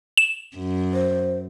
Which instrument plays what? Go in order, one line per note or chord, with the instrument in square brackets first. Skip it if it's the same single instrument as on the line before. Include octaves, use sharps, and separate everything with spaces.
[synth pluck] E7
[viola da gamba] F#2
[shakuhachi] C5